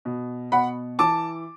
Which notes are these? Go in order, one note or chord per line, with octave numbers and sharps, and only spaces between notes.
B2
B2 F#5 B5
E3 A5 D6